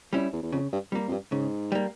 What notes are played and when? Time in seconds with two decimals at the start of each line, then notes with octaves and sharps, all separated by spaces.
0.13 F2 G3 C#4 E4
0.33 E2
0.43 E2
0.52 F2 C#3
0.72 G2
0.92 F2 G3 A#3
1.08 F2
1.12 G2
1.32 G#2 C#3
1.72 G3 A#3